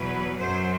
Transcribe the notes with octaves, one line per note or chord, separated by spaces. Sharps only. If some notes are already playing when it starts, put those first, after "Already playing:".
Already playing: E2 B2 F#3 B4
F#2 F#3 C5